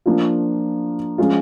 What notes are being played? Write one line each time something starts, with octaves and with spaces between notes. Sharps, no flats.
F3 A#3 D4 F4
F3 G#3 C#4 F4